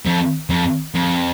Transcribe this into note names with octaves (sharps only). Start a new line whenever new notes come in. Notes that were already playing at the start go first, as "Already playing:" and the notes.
F2
F2
F2